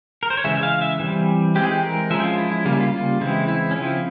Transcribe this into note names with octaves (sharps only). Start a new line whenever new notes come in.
A#4
C5
C#5
C#3 E3 G#3 E5
E5
F5
E5
E3 G3 C4
E3 G#3 C4 G4
G#4
G4
A#4
F3 G#3 C#4 E5
G4
F4
E4
E4
C#3 G3 A#3 F4
E4
F4
F4
C#3 E3 G#3 C4 E4
E4
C#4
C#3 F3 C4 E4